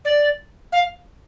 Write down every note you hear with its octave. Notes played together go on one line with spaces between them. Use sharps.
D5
F5